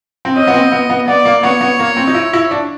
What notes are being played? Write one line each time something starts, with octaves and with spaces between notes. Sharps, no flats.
C4
C#4 D#5
B3
C4
B3
B3
B3 D5
A#3
B3 C#5
B3
A#3
C4
D#4
E4
E4
D4